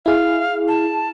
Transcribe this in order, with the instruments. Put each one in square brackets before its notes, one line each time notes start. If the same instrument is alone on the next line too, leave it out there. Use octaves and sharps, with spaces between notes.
[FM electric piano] E4 G#4 [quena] F5
[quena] A5